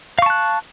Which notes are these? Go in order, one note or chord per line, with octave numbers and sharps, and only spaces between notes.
F5 A5 C#6 F#6